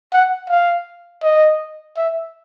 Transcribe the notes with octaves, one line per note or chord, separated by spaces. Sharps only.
F#5
F5
D#5
E5